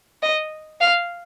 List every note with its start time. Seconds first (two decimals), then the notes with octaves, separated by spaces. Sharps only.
0.22 D#5
0.81 F5